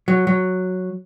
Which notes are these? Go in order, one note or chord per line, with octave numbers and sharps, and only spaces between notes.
F#3
F#3